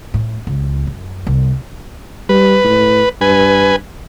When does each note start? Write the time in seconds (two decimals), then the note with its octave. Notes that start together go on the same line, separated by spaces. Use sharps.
0.14 A2
0.47 C#2
0.87 F#2
1.27 C2
2.29 G3 B4
2.65 A2
3.21 G2 B4 G#5